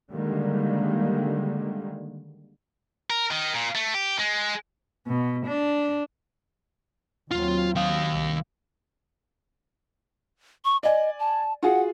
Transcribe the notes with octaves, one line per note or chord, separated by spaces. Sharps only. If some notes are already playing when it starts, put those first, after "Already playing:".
D3 D#3 G3 G#3 A#3
A#4
D#3
A#2
A3
G4
G#3
B2
D4
D#2 F#3 C4 F4
D#3 F5
C2
C#6
D5 D#5 G#5
A5
F4 F#4 G#4 F#5